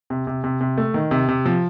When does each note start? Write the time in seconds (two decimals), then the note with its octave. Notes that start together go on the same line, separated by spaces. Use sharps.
0.10 C3
0.27 C3
0.44 C3
0.61 C3
0.78 A3
0.94 D#3
1.11 C3
1.28 C3
1.46 F3